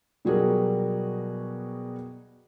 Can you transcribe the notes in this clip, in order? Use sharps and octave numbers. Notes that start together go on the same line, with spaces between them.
B2 F#3 G3 F#4 G#4 A#4